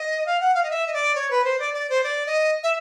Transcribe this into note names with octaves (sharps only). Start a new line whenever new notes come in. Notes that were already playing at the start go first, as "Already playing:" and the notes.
Already playing: D#5
F5
F#5
F5
D#5
E5
D#5
D5
C#5
B4
C5
D5
D5
C5
D5
D#5
E5